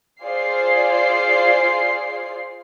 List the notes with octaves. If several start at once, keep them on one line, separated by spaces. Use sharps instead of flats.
F4 G#4 C5 D5 F5 C7